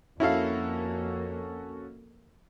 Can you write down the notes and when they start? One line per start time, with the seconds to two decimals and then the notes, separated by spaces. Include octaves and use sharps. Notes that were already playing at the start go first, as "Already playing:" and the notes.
0.20 F2 A#3 C#4 E4 F#4 A4 F5